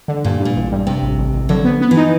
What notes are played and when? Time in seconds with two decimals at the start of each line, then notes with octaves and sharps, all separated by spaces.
0.08 D3
0.24 G2 A#2
0.40 G2
0.45 A#2
0.55 A1
0.72 G2
0.87 G2 C3
1.02 A1
1.18 A1
1.34 A1
1.49 D3 F#3
1.65 B3
1.81 B3
1.91 E3
1.97 D#4